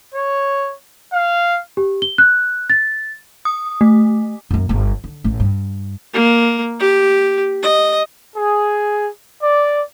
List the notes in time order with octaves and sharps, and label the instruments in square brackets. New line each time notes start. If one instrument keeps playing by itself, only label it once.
[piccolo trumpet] C#5
F5
[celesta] G4
G7
F#6
A6
[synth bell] D#6
A3
[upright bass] F#2 A#3
G1 B3
D3
A1
G2
[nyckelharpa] A#3
G4
D#5
[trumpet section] G#4
D5